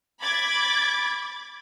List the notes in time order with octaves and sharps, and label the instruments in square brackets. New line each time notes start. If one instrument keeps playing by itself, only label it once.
[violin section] B5 D6 G#6 A6